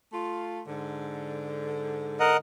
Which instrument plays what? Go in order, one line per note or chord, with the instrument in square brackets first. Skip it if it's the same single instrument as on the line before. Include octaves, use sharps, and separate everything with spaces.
[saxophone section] A3 F4
G#2 D3
[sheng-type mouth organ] A#4 D#5 F#5